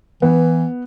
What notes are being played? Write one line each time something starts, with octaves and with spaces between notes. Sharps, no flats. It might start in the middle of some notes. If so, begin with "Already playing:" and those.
E3 B3